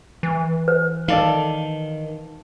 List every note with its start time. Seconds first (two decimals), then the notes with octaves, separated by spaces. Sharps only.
0.23 E3
0.68 B4 C5
1.08 D#3 A4 D5 F5